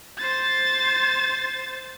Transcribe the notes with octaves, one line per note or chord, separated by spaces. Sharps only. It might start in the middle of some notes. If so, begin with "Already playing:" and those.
C5 A6